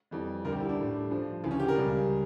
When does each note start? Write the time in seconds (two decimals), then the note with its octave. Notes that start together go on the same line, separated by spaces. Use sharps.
0.11 F2 E3 G3
0.45 D2 D3 G3 A#4
0.52 G4
0.61 E4
0.69 D4
0.78 A2 G3
1.10 G2 F3
1.44 D2 C#3 E3
1.51 C#4
1.60 G4
1.68 A#4
1.75 C#2 C#3 G3